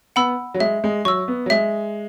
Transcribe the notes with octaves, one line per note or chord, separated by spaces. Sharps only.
B3 F#5 B5 E6
F#3
G#3 E5
G#3
F#3 C#6 E6
B3
F#3
G#3 E5